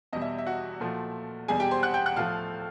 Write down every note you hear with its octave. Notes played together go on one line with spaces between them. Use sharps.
E2 B2 G3 D#5
E5
E5
F#4 F#5
A#2 F3 A3
E2 B2 G3 G#4 G#5
G4 G5
C5 C6
F#5 F#6
G5 G6
F#5 F#6
A2 F3 A3 F5 F6